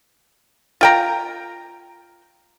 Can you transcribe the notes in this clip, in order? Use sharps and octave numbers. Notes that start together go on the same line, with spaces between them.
F4 G5 A#5